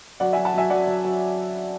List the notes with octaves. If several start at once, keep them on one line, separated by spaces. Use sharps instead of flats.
F#3 D5 F#5
F#3 E5 G#5
F#5 A5
F#3 E5 G#5
F#3 D5 F#5
F#3
F#3